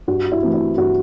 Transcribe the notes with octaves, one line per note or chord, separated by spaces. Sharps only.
G2 F#4
E4
E3 A3 C4
E4
G2 F#4